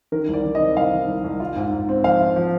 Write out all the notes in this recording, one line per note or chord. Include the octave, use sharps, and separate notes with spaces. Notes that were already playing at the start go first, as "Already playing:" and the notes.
D#3 A#4
C2
D5
D#3
D#5
C3
C2 F5
D#3
C2
C2
F4
G#2
G#2
C4
F3 F5
F4
F3